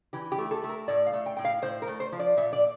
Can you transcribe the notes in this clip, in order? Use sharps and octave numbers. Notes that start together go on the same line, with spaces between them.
E3 G4
G4
A3
A4
A3
A#4
A2 D5
F5
A3
G5
A2 G5
F5
A2 C5
A#4
A3
C5
F3
D5
A#2 E5
D5